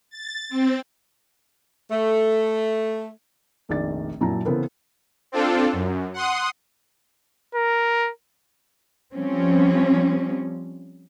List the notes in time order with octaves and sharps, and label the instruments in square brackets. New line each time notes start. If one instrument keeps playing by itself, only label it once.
[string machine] A6
C4
[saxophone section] A3
[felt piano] F1 A#1 D#3 D5 A6
F#2 A#2 F#3 E4 A5 A#5
C#3 E3 B3 C4 A4 A#4
[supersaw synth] C4 D4 F4 A4
F#2
F#5 C6 D#6
[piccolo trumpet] A#4
[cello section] F3 G3 C4 C#4